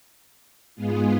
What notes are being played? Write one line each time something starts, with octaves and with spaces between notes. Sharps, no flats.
G#2 G#3 B3 F4 G#4